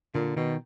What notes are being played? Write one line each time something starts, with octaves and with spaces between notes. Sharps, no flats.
A#2 D3
B2 D#3